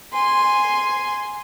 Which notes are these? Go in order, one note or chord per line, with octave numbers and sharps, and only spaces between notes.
G#5 C6